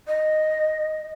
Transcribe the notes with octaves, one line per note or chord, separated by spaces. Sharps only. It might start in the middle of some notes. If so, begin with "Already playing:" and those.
D#5